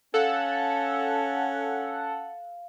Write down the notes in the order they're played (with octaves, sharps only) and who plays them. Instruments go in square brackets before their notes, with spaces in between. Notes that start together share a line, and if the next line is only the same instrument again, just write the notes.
[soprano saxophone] C#4 [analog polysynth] A4 F#5 [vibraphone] F5